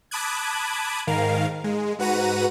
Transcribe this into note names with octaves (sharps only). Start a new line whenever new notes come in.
A5 B5 D6 D#6 F#6 G#6
G#2 D#3 A#4 F5
G#3
G#2 F#4 B4 F#5 A#5 D#7